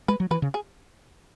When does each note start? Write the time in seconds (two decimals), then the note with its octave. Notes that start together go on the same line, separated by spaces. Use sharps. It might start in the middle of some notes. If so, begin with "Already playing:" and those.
0.08 G#3 B4
0.20 F#3
0.31 E3 B4
0.42 C#3
0.54 G#4